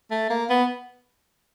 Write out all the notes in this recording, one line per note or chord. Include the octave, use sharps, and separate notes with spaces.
A3
A#3
B3